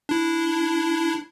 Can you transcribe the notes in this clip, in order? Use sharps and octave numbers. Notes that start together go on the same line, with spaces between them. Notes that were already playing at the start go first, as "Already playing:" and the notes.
D4 E4